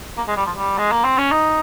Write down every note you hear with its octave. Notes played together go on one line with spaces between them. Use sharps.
A#3
G#3
G3
F3
G3
G#3
A#3
C4
C#4
D#4